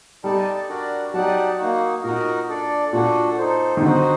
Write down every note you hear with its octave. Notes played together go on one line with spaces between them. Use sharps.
G3 D#4 A4 D5 A5
D4 F#4 A#4 D5
F#3 D#4 G4 D5 F#5 A5
A#3 D#4 F#4
A#2 D#4 F#4 A#4
D4 A4 D5
A#2 D4 F#4 A4
D#4 A4 C5
D#3
D3 D#4 F#4 C5